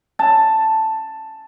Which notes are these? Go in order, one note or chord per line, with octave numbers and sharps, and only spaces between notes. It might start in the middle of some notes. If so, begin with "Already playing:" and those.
A5